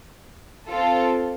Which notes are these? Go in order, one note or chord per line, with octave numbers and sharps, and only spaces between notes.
C4 F4 A4